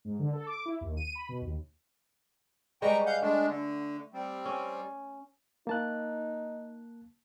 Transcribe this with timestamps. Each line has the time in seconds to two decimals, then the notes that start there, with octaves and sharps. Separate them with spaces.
0.05 G#2
0.19 D3
0.33 A4
0.47 D6
0.66 E4
0.81 D#2
0.97 D#7
1.15 B5
1.29 B2
1.42 D#2
2.82 G3 G#3 B4 G5 A#5 C#6
3.06 F5 F#5 G6
3.22 G#3 A3 D4
3.47 D3
4.14 G3 C4
4.46 C#4
5.67 A#3 D#4 A5 F#6